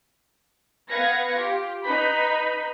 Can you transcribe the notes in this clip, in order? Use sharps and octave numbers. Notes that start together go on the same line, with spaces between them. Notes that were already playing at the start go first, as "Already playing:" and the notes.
B3 B4 F5 G#6 A#6 C#7
F4 G4
D#4 B4 B5 G6 B6